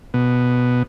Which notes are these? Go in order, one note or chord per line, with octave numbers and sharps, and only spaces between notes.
B2